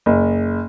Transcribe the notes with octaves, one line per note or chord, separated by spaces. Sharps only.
F#1